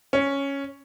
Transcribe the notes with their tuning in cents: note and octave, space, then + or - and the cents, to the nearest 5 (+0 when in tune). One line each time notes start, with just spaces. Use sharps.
C#4 +0